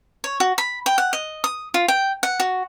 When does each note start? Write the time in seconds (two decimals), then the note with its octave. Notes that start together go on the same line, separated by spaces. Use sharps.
0.24 C#5
0.40 F#4
0.58 B5
0.86 G5
0.98 F#5
1.13 D#5
1.44 D#6
1.74 F4
1.88 G5
2.23 F#5
2.40 F#4